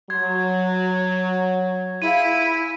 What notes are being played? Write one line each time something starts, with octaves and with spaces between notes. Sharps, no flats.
F#3 C6 G#6
E4 F4 G#4 F5 D#7